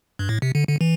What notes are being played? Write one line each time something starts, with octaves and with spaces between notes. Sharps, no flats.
G2
A2
C3
D3
D3
E3